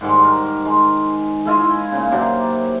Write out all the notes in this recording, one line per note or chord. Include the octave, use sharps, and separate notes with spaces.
G#2 D#3 G3 G#3
A#4
G#3
G#3 E4 F4 D#5
A#2 C#3
C3 F#3 A#3 D4